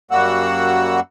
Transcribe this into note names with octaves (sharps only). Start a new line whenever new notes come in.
F#2 G3 A#3 F#4 F#5 E6